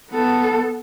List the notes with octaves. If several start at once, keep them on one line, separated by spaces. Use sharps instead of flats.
B3 A4